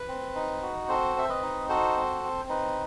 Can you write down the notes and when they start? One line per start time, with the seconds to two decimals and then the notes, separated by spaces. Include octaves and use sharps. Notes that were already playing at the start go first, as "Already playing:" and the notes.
Already playing: B4
0.09 C4
0.35 D#4
0.62 F#4
0.89 C4 A4 C5
1.16 C4 E5
1.29 B4 D#5
1.42 D#4
1.69 F#4 A4 C5
1.97 C4
2.24 C4
2.49 D#4 B4